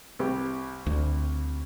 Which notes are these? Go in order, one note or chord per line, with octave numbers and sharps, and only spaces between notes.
C2 G4
D2